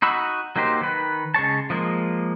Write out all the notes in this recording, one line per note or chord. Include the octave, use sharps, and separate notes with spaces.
D#4 F#4 B5 E6
F#3 A#3 D#4 G4 C5
D#3 B4
C#3 G#3 C#5 A5
F3 G#3 A#3